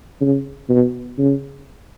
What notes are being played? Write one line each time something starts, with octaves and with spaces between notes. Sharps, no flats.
C#3
B2
C#3